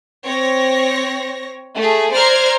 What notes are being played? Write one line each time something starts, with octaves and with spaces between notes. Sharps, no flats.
C4 C#5 A#6
A3 G#4
C5 D5 A#5 F6 G#6 C7